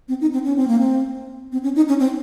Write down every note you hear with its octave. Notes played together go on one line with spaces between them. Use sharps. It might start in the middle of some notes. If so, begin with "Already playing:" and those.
C4
D#4
C4
C#4
C4
A#3
C4
C4
C#4
D#4
C#4
C4